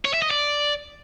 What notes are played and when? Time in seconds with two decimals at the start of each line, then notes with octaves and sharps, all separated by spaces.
0.05 C#5
0.14 E5
0.22 D#5
0.31 D5